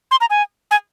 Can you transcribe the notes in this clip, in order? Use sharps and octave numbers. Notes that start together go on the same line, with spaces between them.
C6
A#5
G#5
G#5